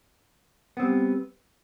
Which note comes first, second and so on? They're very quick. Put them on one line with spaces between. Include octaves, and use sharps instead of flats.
B3 C4 G3